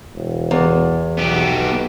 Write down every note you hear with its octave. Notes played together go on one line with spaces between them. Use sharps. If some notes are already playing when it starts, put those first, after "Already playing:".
E1
E2
B1 B3 G4